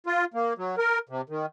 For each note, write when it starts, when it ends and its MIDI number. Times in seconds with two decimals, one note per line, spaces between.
0.06 0.25 65
0.34 0.53 58
0.58 0.76 54
0.78 0.99 70
1.09 1.21 48
1.29 1.46 51